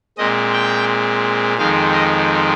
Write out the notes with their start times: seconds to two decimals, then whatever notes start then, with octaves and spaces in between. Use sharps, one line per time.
0.18 A#2 G#3 C4 D#5
0.53 G5
1.58 F2 D#3 G#3 C4 F5
1.93 D#5